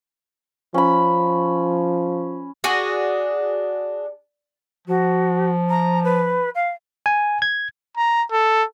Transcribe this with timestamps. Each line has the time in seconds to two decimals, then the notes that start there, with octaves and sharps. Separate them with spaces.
0.74 F3 C#4 B5
2.64 D4 F#4 G#4
4.88 F3 F#4
5.69 A#5
6.04 B4
6.55 F5
7.06 G#5
7.42 G#6
7.97 A#5
8.32 A4